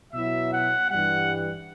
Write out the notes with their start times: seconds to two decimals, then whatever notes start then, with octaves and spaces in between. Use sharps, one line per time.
0.13 B2 F#3 B3 E4 E5
0.52 F#5
0.90 G2 E3 G3 F#5